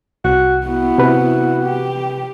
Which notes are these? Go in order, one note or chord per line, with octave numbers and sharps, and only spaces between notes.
C2 F#4
B3 E4 F#4
C3 B4
G4